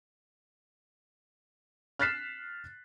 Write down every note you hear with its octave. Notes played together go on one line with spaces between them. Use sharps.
F6 F#6 A6 B6 C7 E7